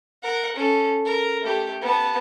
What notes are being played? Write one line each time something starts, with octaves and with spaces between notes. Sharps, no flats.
A#4 F#5
C#4 A4
A#4
A3 G4
B3 A5